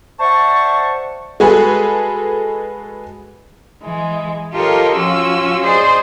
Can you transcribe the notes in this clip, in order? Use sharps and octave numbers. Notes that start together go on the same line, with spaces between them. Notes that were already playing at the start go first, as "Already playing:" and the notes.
C5 D5 E5 F#5 A5 C#6
G#3 F#4 G#4 A4 B4
E3 G#3
F4 G4 A4 A#4 C#5 D#5
F3 C#4 F4 F#4 E6
G#4 C5 D5 D#5